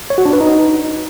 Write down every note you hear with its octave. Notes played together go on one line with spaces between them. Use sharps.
C#5
F#4
D4
B4
D#4